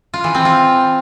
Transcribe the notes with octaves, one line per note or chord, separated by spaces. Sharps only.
F4
E3
C4
F4